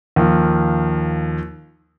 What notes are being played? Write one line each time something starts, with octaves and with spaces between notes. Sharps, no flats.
D#2 F3